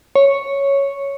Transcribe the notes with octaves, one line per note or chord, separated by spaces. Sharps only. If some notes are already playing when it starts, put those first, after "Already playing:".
C#5